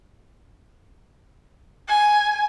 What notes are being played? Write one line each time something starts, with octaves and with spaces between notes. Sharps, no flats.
G#5